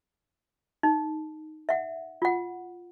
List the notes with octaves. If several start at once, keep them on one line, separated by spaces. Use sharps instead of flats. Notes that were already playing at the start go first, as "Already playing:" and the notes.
D#4
E5 F#5
F4 F#5